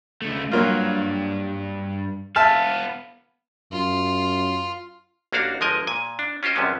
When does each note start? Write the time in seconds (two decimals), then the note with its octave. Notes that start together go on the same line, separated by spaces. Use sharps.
0.22 C#2 A3
0.52 G2 F#3 A#3 F4
2.36 B3 E5 F5 A5 F6
3.72 F#2 F4
5.33 A1 A#3 D4 F#4 F5
5.61 G1 F3 G#3 A#4 D#5 G#5
5.87 A#2 G#5
6.19 D4
6.43 C#4 F4 G4 C5 D#5
6.55 A#1 F#2 C3 B3 C#4